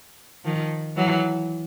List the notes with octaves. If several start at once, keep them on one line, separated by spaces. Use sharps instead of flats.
D#3 F3
E3 F#3